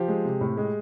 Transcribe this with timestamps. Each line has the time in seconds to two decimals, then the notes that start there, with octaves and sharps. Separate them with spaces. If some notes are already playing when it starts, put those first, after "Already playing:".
Already playing: F3 G4
0.08 G#3
0.25 C3
0.41 A2
0.57 G#3